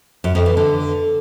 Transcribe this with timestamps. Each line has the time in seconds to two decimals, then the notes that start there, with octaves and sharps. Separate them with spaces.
0.24 F#2
0.35 F2
0.46 E3
0.57 D3